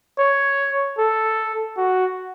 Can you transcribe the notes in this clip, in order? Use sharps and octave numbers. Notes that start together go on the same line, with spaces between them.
C#5
A4
F#4